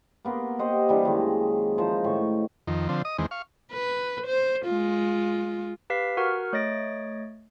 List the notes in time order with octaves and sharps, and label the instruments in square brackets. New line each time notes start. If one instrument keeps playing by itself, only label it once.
[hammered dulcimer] A#3 B3 A#4 C6
G4 C5 D#5 F#5
E3 G3 D4
F#2 D#3 G#3
E3 F3 D#4 C5
A2 D#3 C#6
[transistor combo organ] F2 D#3
D3 F3 C4
D#5 D#6
E2 D#3 G#3 C4
F5 C#6
[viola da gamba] B4
C5
G#3 F4
[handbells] G4 B4 F5 B6 C7
F#4 A#4 F#5 C#6 F6
A3 C#5 D#5 A6 A#6 D7